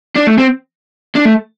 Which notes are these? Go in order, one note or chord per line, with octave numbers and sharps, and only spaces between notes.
D4
A3
C4
D4
A3